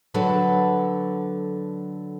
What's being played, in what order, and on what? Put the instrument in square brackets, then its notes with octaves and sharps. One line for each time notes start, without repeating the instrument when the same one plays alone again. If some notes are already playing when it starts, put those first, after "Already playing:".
[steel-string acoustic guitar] D3 F#3 A4 B4